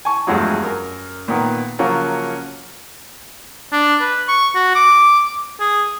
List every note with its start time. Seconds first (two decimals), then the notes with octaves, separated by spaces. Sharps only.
0.05 G#5 A5 C#6
0.27 E2 G2 F3 F#3 G#3 A3
0.62 F#2 A#4
1.28 A#2 D#3 B3
1.79 C#3 F3 F#3 A#3 C#4
3.72 D4
4.01 B4
4.28 C#6
4.55 F#4
4.75 D6
5.60 G#4